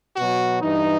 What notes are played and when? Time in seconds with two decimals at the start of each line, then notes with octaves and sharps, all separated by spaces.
0.16 B2 F#3 F#4
0.61 G2 E3 D#4